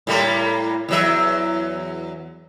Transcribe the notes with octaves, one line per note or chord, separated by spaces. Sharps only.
A2 G3 A#3
E2 F#3 E5